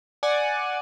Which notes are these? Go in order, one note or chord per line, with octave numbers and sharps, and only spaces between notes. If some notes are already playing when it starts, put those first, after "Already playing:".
D5 F#5 G#5